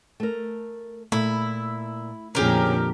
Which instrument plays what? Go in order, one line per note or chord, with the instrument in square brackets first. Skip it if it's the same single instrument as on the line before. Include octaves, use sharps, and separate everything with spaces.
[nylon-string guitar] A3 A#4
[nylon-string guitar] A#2 [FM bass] A3 [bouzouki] E4
[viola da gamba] F2 A#2 D3 [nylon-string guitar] C#4 G#4 [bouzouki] G4 A#4